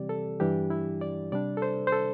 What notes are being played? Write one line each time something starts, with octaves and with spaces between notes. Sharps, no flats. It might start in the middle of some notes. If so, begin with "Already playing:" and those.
Already playing: C3 E3 G3 C4 G4 D5
A4
G2 E3 G3 D4 G4
E4
D5
C3 G3 D4 D5
A4
C5
C5
A4